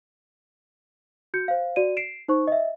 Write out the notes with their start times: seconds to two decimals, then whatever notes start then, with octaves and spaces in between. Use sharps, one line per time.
1.34 F#4 G6 C#7
1.48 C5 F5
1.76 F#4 D5 D#7
1.97 C7 D7 E7
2.28 D#4 C5 C#6
2.47 D#5 E5